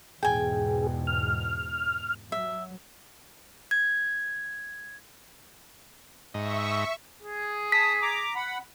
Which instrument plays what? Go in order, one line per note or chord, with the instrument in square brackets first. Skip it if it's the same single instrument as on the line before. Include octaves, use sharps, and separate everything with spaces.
[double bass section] E2 G#2 B2 [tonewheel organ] G#4 [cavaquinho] G5 G#5
[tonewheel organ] F6
[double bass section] F#3 [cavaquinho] E5
[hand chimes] G#6
[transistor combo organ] G#2 D#5 [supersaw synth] E5 C#6
[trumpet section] G#4
[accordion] A5 D#6 [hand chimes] B6
[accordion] A#5 D6
F#5 B5